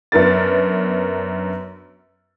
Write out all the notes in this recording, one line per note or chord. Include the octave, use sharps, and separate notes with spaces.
F#2 B3 D4 A#4 B4 A6